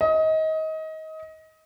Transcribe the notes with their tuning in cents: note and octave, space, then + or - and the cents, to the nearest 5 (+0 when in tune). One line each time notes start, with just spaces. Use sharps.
D#5 +25